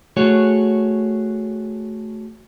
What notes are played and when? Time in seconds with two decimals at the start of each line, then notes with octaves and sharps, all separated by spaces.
0.17 A3 F#4 G#4 C#5